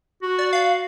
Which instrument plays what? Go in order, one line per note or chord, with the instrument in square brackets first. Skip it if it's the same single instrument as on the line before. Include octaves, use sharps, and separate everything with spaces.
[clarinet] F#4
[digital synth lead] D5
F5